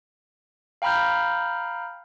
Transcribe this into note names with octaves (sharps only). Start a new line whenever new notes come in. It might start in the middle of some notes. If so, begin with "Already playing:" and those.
F5 G5 A#5 B5 F6 G6